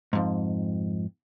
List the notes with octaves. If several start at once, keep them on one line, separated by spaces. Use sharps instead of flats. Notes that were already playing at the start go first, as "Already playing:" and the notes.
F2 G#2